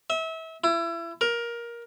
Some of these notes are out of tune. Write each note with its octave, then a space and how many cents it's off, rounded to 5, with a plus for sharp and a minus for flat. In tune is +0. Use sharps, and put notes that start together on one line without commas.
E5 -30
E4 +30
A#4 +15